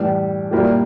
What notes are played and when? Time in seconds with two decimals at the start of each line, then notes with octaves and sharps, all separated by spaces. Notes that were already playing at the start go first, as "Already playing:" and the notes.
Already playing: A2 E3 G3
0.51 A#2 G3 A#3 E4 G4